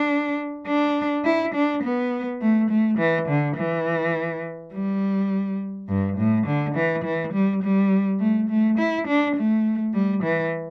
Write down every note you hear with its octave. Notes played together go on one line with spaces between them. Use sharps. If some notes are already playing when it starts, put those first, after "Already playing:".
Already playing: D4
D4
E4
D4
B3
A3
A3
E3
D3
E3
G3
G2
A2
D3
E3
E3
G3
G3
A3
A3
E4
D4
A3
G3
E3